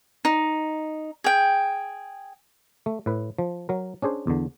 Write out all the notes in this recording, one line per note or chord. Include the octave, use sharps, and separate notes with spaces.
D#4
G#4 G5
A3
A2 B4
F3
F#3 A#4
C#4 D4 G#4 C5
E2 D3